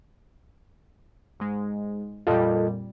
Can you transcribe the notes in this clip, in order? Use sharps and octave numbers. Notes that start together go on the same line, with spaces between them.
G#2 G#3
F2 A#2 G3 F4 A4 D#5